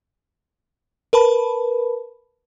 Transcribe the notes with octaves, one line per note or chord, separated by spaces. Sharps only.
A#4 B4 A5 B5